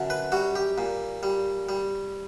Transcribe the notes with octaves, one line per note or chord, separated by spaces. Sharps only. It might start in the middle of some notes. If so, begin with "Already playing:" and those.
Already playing: F#2 D3
B4
G3 F#4
G4
A#2
G3
G3